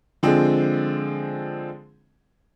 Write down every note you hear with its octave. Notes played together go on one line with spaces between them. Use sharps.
D3 F3 G#3 C4 G#4